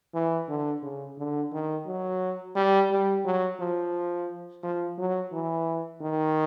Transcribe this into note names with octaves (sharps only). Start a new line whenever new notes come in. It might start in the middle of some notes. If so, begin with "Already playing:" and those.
E3
D3
C#3
D3
D#3
F#3
G3
G3
F#3
F3
F3
F#3
E3
D#3